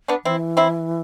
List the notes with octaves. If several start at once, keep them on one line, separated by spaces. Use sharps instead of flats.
B3 D4
E3 C4 E4
C4 E4